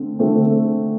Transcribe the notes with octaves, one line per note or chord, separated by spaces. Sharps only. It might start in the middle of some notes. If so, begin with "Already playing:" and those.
Already playing: D3 A3 C4
D3 A3 C4